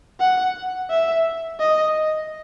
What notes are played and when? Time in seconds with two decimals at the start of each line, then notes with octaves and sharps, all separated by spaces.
0.20 F#5
0.90 E5
1.60 D#5